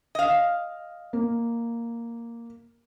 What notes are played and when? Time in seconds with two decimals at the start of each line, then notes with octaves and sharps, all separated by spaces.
0.15 D#5 F5
1.13 A#3